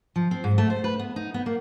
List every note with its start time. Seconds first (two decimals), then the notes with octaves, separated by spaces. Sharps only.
0.16 F3
0.31 C4
0.44 G#2
0.58 A3
0.70 C5
0.84 B4
0.99 B3
1.16 D#4
1.34 B3
1.46 A#3